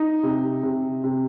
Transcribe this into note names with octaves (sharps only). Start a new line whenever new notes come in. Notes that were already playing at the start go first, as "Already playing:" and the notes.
Already playing: D#4
C3
C3
C3